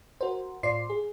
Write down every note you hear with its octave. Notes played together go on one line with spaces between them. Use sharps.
F#4 A#4 C5
A2 F4 C5 D5 C6 C7
G#4